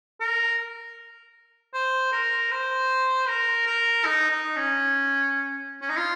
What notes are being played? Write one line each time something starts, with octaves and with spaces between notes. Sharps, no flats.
A#4
C5
A#4
C5
A#4
A#4
D#4
D#4
C#4
C#4
D#4
F4